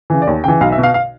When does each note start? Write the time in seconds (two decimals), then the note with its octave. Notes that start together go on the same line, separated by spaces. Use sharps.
0.10 C#3 E3
0.22 D5
0.27 D#2 C#5
0.44 C#3 E3 G5
0.61 B1 F5
0.72 E5
0.78 B2
0.83 F5
0.94 F5